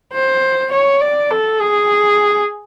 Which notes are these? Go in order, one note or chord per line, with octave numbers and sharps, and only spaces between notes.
C5
C#5
D5
A4
G#4